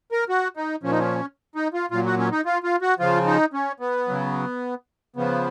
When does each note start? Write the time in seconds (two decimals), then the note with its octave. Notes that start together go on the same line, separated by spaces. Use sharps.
0.12 A#4
0.29 F#4
0.57 D#4
0.83 A#2 F3 C#4
0.92 D#4
0.99 C#4
1.55 D#4
1.74 F4
1.91 A#2 F#3 F4
2.06 F#4
2.19 C#4
2.32 D#4
2.46 F4
2.64 F4
2.82 F#4
2.99 C#3 F3 F4
3.27 D#4
3.53 C#4
3.80 B3
4.08 C#3 F#3
5.16 C#3 F3 B3